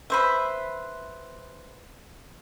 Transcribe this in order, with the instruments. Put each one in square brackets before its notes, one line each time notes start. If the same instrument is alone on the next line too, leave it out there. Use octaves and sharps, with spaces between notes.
[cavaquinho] B4 C5 E5